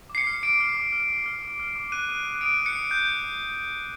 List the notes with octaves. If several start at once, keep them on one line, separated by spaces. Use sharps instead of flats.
D6
C7
C#7
F6
D6 D7
F6
D6
F6
D6
F6
D6
F6
D6
F#6 D#7
D#6
F#6
D#6 D7
F#6
C#7
D#6
F#6 G6